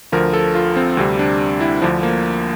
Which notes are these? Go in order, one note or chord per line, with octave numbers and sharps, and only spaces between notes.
D2 D3 F3 A#4
A4
F4
C4
D2 C3 G3 C4
D4
E4
D2 D3 F3
A#3